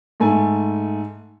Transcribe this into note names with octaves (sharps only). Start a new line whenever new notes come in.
G#2 A3 G#5